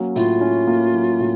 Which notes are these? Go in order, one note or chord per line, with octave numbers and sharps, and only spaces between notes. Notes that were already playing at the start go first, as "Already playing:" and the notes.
Already playing: F#3 A#3 C#4
A2 F4
C#4
A#3
F#3
A2